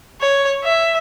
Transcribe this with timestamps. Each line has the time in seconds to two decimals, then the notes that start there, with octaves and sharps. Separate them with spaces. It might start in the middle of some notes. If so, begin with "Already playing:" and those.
0.21 C#5
0.64 E5